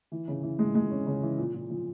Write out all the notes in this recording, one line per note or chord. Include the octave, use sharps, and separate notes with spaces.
E3
C#3
E3
G#3
G#3
C#4
C#3
E3
A#2
A#2
F3